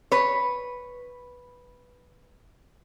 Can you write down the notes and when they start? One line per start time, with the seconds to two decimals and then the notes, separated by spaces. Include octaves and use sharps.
0.12 B4 C#5